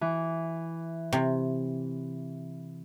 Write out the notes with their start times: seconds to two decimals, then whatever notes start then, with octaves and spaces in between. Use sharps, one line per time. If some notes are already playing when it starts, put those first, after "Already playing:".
0.01 E3
1.13 C3